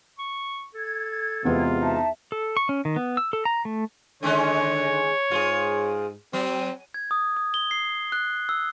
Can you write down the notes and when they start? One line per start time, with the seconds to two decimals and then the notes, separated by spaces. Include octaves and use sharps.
0.19 C#6
0.75 A4 G#6
1.45 E2 C3 G#3 B3 F4
1.81 D#4 E5 A5
2.32 A4
2.57 C#6
2.69 C#4
2.85 D#3
2.96 B3
3.17 E6
3.33 A4
3.45 A#5
3.65 A3
4.23 D3 D#3 G#3 C#4 C#5
5.31 G#2 F4 G#4
6.33 F#3 C4
6.94 G#6
7.11 D#6
7.37 D#6
7.54 G7
7.71 C7
8.12 F#6
8.49 E6